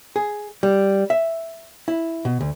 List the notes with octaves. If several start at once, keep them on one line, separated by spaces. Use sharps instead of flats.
G#4
G3
E5
E4
B2
D2